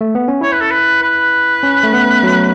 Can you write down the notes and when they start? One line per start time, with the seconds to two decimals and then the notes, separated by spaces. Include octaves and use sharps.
0.01 A3
0.15 B3
0.28 C#4
0.41 E4 C#5
0.52 B4
0.61 A4
0.71 B4
1.02 B4
1.63 C#4
1.83 A3
1.93 B3
2.23 F#3